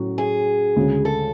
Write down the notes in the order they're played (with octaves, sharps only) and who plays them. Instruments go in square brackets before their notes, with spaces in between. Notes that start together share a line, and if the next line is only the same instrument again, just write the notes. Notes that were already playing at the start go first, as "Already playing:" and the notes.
Already playing: [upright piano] A2 F#3 C#4 F#4
[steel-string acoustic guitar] G#4
[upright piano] D2 C#3 G#3
[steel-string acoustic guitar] A4